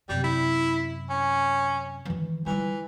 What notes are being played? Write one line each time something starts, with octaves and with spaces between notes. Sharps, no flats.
F#2 C3 G3
E4
C#4
D#3 E3
E3 G3 F4